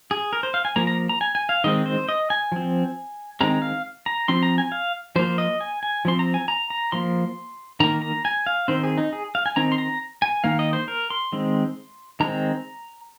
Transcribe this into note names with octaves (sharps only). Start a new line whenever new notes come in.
G#4
A#4
C5
F5
G#5
F3 A#3 A#5
A#5
A#5
G#5
G#5
F5
D#3 G#3 C4 D#5
C5
D#5
G#5
F3 C4
D#3 G#3 C4 A#5
F5
A#5
F3 C4 C6
A#5
G#5
F5
F3 A#3 C5
D#5
G#5
G#5
F3 C4 C6
A#5
G#5
A#5
A#5
F3 A#3 C6
D#3 A#3 A#5
A#5
G#5
F5
D#3 C4 C5
G#4
D#4
G#4
F5
G#5
D#3 C4 A#5
C6
A#5
G#5
D#3 A#3 F5
D#5
C5
A#4
C6
D#3 G#3 C4
D#3 G#3 C4 A#5